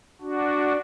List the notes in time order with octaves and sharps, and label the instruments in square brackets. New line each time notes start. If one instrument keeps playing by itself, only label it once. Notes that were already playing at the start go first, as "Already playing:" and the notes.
[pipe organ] D4 F#4